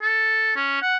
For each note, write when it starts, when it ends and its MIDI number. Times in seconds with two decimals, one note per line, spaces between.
0.02 0.53 69
0.56 0.78 61
0.82 0.97 78